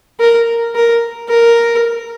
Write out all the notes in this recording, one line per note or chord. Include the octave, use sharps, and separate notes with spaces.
A#4
A#4
A#4